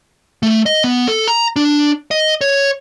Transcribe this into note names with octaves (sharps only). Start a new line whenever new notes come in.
A3
D#5
B3
A4
A#5
D4
D#5
C#5